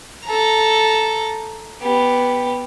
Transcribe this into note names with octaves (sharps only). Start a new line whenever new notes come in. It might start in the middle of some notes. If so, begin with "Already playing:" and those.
A4 A#5
B3 G4